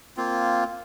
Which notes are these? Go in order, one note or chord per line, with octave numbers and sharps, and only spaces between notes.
A#3 C4 F4